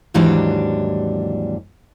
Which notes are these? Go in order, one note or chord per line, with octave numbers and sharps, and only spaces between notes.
D#2 G#2 E3 F#3 G3 D4